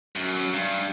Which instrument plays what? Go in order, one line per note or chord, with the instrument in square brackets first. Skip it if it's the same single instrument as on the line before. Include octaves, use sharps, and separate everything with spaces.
[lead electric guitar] F#2
G2